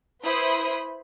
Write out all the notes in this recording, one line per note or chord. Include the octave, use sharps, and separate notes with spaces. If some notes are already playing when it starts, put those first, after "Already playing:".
E4 B4 C5 B5 C6 D#6